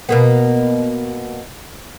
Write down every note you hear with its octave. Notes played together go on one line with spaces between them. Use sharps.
B2 A#3 B3